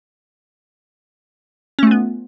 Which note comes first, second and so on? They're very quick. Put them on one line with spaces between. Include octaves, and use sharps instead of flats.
C#4 A3 F4 B3